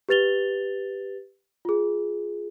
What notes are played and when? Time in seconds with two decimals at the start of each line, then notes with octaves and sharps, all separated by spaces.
0.09 G4 B4 A6 F7 G7
1.65 F4 G#4